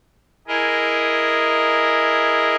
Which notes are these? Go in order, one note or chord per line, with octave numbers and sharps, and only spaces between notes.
E4 G#4 A#4 D#5